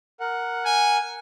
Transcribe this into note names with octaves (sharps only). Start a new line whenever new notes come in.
A#4 F#5
G#5